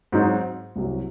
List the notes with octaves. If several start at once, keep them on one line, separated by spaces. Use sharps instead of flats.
G#2 F#3 C4 D#4 F#4
C2 C3 F#3